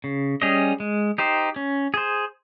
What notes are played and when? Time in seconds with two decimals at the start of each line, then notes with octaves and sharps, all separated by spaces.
0.04 C#3
0.42 G3 C#4 G#4 D#5
0.80 G#3
1.18 D#4 G4 C5
1.56 C#4
1.94 G#4 C5